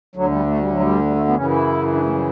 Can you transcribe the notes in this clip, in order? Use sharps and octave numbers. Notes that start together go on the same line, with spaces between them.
D2 D3 F#3
G3
A3
G3
F#3
G3
G3
A3
B3
F#2 C#3 E3 C#4
E4
D4
A3
G3